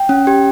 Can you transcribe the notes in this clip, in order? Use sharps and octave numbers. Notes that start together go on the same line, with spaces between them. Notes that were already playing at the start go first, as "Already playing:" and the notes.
Already playing: G5
C#4
G4